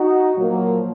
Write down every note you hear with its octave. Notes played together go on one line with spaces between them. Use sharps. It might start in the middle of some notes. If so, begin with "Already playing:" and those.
Already playing: D#4 F#4
A#2 F3 F#3 A#3